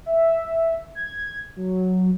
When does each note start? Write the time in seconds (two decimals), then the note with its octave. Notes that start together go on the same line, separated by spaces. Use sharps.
0.06 E5
0.95 G#6
1.56 F#3